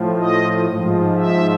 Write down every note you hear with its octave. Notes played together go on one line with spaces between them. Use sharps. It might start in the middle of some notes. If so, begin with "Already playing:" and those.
Already playing: A2 F3
D#5
G#2 F3
E5